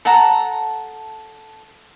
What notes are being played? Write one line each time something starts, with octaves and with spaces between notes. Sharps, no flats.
A4 F#5 A5 A#5